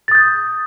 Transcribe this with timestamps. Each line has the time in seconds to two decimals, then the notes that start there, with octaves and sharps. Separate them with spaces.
0.08 A6
0.11 D#6
0.15 G6